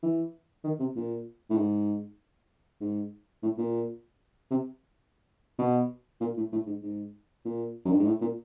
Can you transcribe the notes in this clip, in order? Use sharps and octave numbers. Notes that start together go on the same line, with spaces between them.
E3
D#3
C3
A#2
A2
G#2
G#2
A2
A#2
C3
B2
A#2
A2
A2
G#2
G#2
A#2
F#2
G2
G#2
A2
A#2